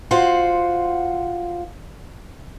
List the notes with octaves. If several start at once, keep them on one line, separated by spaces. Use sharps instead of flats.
F4 F#4 C5 F#5